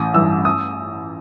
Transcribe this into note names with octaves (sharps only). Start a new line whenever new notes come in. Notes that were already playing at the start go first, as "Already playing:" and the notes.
Already playing: A1 D#6
G2 E3 E6
D#6